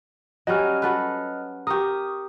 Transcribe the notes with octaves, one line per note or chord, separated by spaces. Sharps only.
F#3 G3 C#4 D#5 F6
F#4 A4 B4
G4 A#4 C#6 D#6